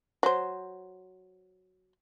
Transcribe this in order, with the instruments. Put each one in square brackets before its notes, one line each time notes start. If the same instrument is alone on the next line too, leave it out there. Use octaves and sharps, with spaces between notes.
[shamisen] F#3 C5